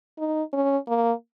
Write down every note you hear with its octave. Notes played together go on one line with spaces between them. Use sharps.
D#4
C#4
A#3